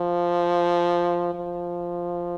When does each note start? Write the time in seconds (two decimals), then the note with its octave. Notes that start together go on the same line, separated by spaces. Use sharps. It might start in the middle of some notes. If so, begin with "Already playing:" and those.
Already playing: F3
1.35 F3